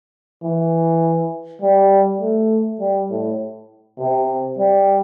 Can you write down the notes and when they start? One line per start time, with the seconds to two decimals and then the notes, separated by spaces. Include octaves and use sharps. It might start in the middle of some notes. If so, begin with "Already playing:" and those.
0.43 E3
1.62 G3
2.20 A3
2.80 G3
3.10 A2
3.99 C3
4.58 G3